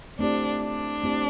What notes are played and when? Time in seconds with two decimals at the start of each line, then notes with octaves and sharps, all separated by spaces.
0.19 A3 C4 D4 E4 G4 D5
0.61 D4
1.04 A3 C4 E4 G4 D5